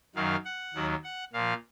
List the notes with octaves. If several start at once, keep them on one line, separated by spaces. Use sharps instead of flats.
F#2 D#3 F#3 F5
F#5
D#2 D#3 F#3
F#5
A#2 F3 F5